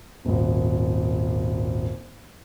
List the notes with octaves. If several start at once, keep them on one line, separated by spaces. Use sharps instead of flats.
D#1 G#1